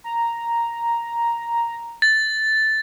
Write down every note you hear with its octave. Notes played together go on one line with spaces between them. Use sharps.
A#5
A6